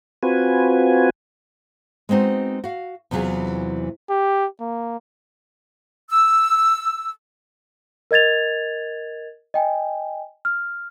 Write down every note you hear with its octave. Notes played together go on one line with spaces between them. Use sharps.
C4 F4 F#4 B4 G#5
G#3 B3 C4 D#4 F#4
F#4 F5
E2 C3 E3 F#3 F4 G#4
G4
A#3
E6
A#4 D#5 G#6 A6 F7
D#5 G5 G#5
F6